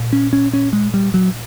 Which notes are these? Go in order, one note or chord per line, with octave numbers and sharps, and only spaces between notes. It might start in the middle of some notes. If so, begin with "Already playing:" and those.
Already playing: A#2
C#4
C#4
C#4
G#3
G3
F#3